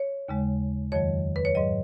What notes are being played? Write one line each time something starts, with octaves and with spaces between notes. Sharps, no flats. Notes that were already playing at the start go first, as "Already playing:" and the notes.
Already playing: C#5
D#2 C#3 G#3
F2 D#3 F#3 C#5
B4
C#5
G#2 F#3 D#5